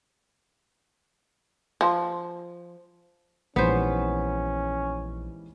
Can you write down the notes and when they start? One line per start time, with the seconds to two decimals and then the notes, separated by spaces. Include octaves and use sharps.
1.81 F3
3.56 A#1 G#2 E3 G3 B3 C#4 C5